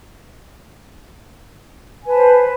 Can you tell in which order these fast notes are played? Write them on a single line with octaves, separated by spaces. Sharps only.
G#5 B4 A5 C5